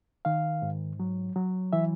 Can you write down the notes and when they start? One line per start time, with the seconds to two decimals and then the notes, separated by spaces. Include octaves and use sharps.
0.25 D#3 F5
0.62 G#2
1.00 F#3
1.36 F#3
1.73 E3 E5